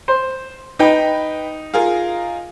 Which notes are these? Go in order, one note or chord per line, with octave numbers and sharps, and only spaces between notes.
C5
D#4 B4 G5
F4 G#4 A#4